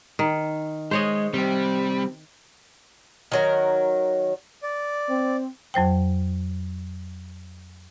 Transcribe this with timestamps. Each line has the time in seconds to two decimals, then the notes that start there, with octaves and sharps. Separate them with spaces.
0.19 D#3
0.91 G#3 C5 C#5 D#5
1.34 C3 G3 C4
3.32 D#3 F#3 A#4
4.63 D5
5.10 C4
5.74 F2 F#3 C5 G5